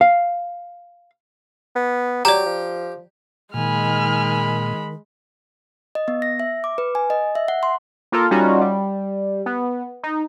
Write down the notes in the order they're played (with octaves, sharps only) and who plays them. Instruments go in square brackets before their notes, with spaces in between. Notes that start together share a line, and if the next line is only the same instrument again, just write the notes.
[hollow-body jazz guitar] F5
[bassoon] B3
[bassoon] F#3 [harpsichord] G4 [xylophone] D5 A#5
[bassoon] F3
[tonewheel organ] A#2 [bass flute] D#3 [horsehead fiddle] G#3 B5 [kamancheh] G#5 F6
[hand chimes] D#5
B3
A#6
E5
D6
B4
G#5
D#5
E5
F#5
C6
[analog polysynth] A#3 F4 A4 A#4
G3 C#4 D#4 F4 F#4
G3
B3
D#4